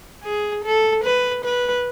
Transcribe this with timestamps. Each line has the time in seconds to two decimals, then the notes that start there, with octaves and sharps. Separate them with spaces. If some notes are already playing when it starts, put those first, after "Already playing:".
0.24 G#4
0.64 A4
1.04 B4
1.44 B4